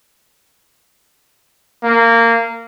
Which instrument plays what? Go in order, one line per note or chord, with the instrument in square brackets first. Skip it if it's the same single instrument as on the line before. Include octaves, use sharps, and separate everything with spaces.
[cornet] A#3